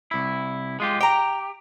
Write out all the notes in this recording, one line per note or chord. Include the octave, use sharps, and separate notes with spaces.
C2 E4
G#3 F4 G4
G4 G5 A#5